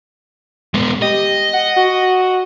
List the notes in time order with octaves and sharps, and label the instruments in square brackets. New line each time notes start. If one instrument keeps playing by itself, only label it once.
[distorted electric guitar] G#3 B3
[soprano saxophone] G4 [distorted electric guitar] D#5
[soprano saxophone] F#5
F#4